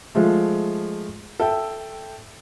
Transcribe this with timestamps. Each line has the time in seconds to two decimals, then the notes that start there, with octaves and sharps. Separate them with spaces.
0.15 F3 G#3 A3
1.40 A4 E5 G5